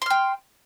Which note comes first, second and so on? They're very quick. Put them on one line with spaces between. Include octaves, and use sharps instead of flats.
C6 F6 G5